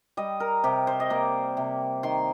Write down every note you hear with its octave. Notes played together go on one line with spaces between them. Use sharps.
G3 D#5
A#4
C3 G4
C5
D#5
A#3 D5
C3
D#3 C6